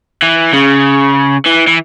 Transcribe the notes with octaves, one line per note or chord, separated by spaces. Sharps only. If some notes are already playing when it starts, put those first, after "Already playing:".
E3
C#3
E3
E3